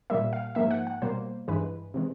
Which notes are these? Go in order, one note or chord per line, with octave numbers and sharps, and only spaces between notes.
A#2 G3 A#3 E5
F5
G#2 F3 A#3 E5
F#5
F#5
B2 G3 A#3 C5
G2 E3 G#3 B4
C3 E3 G#3